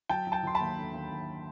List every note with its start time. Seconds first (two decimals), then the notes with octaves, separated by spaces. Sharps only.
0.09 F#3 G5 A5
0.27 F#3
0.32 G5 A5
0.43 F#3 C6
0.55 A5 B5
0.60 D#2
0.78 D3
0.94 D#2
1.11 D#2